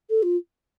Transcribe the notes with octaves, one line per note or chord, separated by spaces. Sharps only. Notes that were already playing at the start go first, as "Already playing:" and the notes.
A4
F4